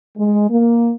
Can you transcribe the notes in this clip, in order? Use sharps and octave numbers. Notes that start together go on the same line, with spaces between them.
G#3
A#3